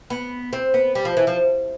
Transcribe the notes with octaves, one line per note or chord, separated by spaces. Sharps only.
B3
C4
B3
G3
F3
E3
F3